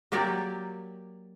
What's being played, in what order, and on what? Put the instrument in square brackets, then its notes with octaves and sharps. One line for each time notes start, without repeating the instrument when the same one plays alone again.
[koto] F#3 A#3 G4 D5 G5